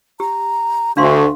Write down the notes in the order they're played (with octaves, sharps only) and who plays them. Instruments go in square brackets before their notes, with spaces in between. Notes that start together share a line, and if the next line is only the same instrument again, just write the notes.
[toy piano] G4 [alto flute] A#5
[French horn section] D2 D3 [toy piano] D4 F5 C6 [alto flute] C#6